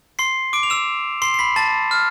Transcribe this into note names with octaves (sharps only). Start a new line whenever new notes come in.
C6 C7
D6 D7
F7
E6 E7
C6 C7
C7
B5 B6
A5 A6
F6